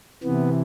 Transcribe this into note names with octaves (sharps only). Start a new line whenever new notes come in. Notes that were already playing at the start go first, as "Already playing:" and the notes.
C3 E3 B3